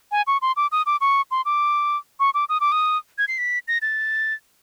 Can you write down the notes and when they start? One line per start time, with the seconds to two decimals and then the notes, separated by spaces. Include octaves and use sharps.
0.12 G#5
0.27 C#6
0.42 C6
0.57 D6
0.72 D#6
0.86 D6
1.01 C#6
1.31 C6
1.45 D6
2.20 C#6
2.34 D6
2.49 D#6
2.60 D6
2.72 D#6
3.18 G#6
3.28 C7
3.38 B6
3.68 A#6
3.82 A6